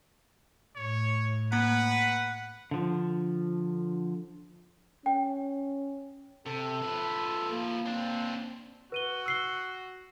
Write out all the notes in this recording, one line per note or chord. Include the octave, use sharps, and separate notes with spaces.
A2 C#5
A#3 B4 F#5 A#5
D3 F3
C#4 G5
C3 A4
F3 B4
A#3
C4 D4
F#4 B4 D#7 G7
E6 C7 G7